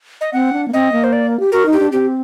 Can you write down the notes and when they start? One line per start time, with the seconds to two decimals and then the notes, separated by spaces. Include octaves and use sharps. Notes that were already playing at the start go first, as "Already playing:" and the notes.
0.21 D#5
0.33 C4 F#5
0.53 D4
0.68 A#3
0.73 C4 D#5
0.92 A#3
1.04 C5
1.13 D5
1.40 G4
1.52 F#4 A#4
1.66 D#4
1.73 G4
1.79 D4
1.92 C4 G4